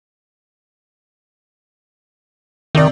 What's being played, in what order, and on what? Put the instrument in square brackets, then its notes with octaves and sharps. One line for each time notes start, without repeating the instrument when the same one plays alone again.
[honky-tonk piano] C3 D5 [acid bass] D#3